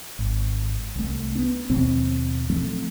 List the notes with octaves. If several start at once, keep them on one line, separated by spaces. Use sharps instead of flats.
G#1
C2 A3
B3 C#4
D#2 B2 F3 C4
F3 F#3 A3 C4